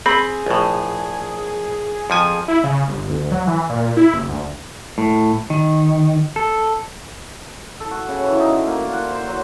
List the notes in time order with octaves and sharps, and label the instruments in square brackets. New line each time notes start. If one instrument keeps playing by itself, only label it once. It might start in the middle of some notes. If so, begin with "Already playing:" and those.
[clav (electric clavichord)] C4 [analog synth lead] G#4 [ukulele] B5
[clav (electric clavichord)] A#1 A2
F2 F3 G#5
[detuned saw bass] E4
C#3
G1
D2
F#3
E3
A#2
E4
F#1
D2
[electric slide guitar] A2
D#3
A4
[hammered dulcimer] A4
F#4
C#3
E3
D#4
D3
A#3
F4
F#5
C5
F#3